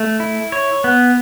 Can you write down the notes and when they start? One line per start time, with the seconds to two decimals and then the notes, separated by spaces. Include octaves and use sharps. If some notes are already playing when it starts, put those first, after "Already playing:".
Already playing: A3
0.20 E4
0.52 C#5
0.84 B3